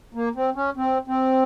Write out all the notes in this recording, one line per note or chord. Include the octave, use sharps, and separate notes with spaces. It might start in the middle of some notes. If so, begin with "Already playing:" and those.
A#3
C4
C#4
C4
C4